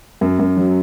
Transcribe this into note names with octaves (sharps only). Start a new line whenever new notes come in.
F#2
F#2
F#3